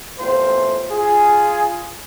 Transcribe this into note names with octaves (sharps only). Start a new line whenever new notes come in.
E2 A2 C3 F4 C5
F4 G#4